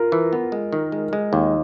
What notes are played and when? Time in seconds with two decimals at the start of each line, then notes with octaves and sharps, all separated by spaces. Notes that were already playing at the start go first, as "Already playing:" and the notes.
Already playing: F4 A#4
0.12 E3
0.33 B3
0.52 G#3
0.73 D#3
0.92 G#3
1.13 G#3
1.33 D#2